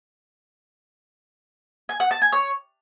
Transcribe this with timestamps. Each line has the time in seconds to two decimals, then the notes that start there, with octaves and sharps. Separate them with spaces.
1.89 G#5
2.00 F#5
2.11 A5
2.22 G#5
2.32 C#5